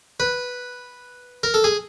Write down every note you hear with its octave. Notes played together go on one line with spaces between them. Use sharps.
B4
A#4
A4
G#4